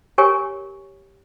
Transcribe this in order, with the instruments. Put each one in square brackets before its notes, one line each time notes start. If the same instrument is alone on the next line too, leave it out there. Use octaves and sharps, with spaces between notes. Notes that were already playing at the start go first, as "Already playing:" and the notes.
[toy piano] G4 A#4 C#5 G#5 C#6